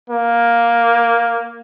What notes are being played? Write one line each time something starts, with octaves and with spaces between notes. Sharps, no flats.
A#3